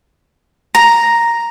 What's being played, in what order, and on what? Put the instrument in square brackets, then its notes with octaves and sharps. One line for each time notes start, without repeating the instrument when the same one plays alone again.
[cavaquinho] A#5